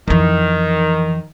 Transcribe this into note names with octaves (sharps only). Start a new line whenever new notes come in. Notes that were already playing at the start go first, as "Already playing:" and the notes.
F2 D#3 E3